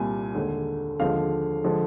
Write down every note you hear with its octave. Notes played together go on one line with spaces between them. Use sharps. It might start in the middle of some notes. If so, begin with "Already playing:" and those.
Already playing: C2 A#2 G3 G#5
D#2 D3 G#3
D#2 D3 F3 G#3 F5
D3 F3 G#3